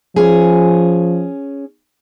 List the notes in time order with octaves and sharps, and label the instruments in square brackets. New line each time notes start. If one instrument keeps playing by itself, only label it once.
[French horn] F3 [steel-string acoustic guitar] C#4 G#4